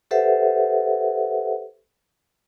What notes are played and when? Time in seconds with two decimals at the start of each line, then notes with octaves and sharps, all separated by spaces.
0.11 G4 A4 B4 C5 E5 F#5